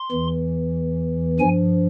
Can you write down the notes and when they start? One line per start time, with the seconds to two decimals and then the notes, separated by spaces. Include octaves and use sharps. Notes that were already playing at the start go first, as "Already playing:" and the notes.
Already playing: C6
0.12 E2 E3
1.39 G2 F3 G#5